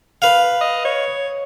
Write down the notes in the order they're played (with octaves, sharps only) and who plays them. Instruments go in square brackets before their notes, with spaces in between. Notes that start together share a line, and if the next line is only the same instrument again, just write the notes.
[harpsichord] B4 F5
[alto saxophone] D#5
C#5